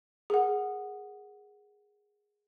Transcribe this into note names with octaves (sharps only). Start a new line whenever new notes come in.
G#4 A#4 F#5